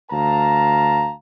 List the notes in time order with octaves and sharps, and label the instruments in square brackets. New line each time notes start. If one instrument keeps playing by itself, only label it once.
[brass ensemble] D2 F5 A5 A#5